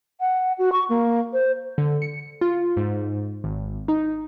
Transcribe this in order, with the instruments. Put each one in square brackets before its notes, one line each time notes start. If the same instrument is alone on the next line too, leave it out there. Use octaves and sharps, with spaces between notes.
[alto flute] F#5
F#4
C#6
A#3
C5
[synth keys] D3
C#7
F4
G#2
G#1
D#4